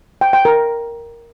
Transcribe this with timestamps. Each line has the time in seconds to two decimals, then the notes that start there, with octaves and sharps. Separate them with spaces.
0.21 G5
0.33 G5
0.45 A#4